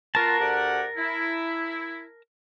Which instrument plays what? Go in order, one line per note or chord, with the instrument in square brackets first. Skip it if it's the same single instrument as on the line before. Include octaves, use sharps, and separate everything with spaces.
[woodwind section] B3 F4 F#4 [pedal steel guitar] A#4 A5
[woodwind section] D2 G4 F#5
E4